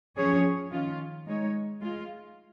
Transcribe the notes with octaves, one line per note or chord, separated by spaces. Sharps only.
F3 C#4 G#4 C#5
D#3 C#4 F4
G#3 D#4 C#5
G#3 F4